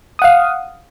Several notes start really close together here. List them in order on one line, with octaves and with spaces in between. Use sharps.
D#6 F#5 F5